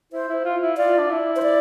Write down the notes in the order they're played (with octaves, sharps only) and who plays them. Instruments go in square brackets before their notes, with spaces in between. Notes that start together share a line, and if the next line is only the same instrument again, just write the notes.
[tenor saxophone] E4 [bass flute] C5
[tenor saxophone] E4
F4
E4
[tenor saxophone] F4 [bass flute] D5
[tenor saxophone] D4
E4
[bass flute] C5
D5